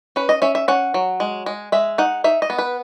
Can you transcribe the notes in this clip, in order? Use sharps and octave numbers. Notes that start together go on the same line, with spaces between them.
C#4 B4
D#5
C#4 E5
E5
C#4 F#5
F#3
G#3
G#3
G#3 E5
D#4 F#5
D#4 E5
D#5
B3
B4